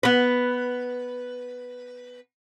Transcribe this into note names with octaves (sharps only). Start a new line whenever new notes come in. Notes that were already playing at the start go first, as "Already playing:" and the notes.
B3 B4